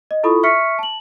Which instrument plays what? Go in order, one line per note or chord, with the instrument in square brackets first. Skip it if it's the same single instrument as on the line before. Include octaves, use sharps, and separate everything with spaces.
[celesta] D#5
E4 F4 A4 B5 C#6 D#6
E5 C#6 F6 B6 C#7
A5 F#7